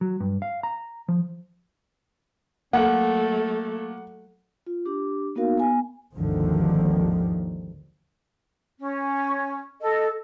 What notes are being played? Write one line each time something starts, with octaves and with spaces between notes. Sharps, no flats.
F#3
G2
F5
A#5
F3
F#3 A3 A#3 F#5
F4
D4 G4 D6
A#3 B3 D#4 F#4 A#4 F5
B3 G#5
G#1 D#2 G#2 D3 D#3 F3
C#4
A4 D#5